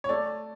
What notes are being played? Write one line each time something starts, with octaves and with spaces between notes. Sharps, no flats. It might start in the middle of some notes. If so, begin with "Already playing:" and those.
C#5
A3 D5